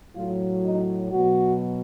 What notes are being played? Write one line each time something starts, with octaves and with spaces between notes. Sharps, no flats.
A2 F#3 F4
D#4
B2 F#3 F#4